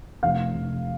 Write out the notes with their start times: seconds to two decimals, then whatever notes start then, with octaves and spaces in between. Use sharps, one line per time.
0.23 F1 F5
0.54 F1